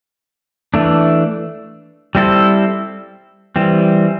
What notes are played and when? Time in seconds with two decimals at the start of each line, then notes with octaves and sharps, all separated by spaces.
0.74 E3 A3 D4
2.15 G3 C4 E4 A4 C5
3.56 E3 G3 C4